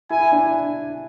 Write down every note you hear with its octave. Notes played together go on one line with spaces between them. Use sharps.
E4 G#5
D4